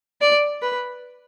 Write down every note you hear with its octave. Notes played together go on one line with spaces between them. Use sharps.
D5
B4